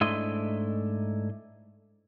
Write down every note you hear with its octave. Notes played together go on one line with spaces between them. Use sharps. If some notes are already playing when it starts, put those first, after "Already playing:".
G#2 A3 D4 E4 D#5 C6